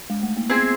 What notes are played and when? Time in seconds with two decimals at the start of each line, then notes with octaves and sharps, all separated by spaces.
0.10 G#3
0.23 A3
0.37 A#3
0.49 B3 C4 E4 G#4 C5